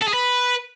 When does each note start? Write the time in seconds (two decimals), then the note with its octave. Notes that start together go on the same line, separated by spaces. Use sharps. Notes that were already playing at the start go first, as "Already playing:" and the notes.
0.01 A4
0.07 G#4
0.13 B4